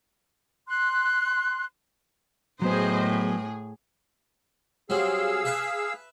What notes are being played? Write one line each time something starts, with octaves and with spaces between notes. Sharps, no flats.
C6 F#6
A2 F#3 B3 G#4 C5 D#5
G#4
F#3 G3 C4 G#4 F5 E6
B4 E5 A5